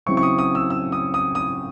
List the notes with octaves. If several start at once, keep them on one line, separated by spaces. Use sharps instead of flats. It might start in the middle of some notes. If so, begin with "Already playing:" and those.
C#3 F#3 C4 E4 C#6
C#6
D#6
D#6
E6
E6
D#6
D#6
D#6